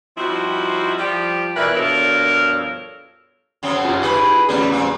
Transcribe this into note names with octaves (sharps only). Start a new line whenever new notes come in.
F3 G3 C4 D#4 E4 F#4
F3 G3 G4
B2 E3 A#4 B4 D5 E5
G2 B2 F3 A4 A#4 C#5
F#2 C#3 C4
F4 G4 G#5
E4 G#4 B4
F#3 G3 A3 C#4 G#4
A#2 C4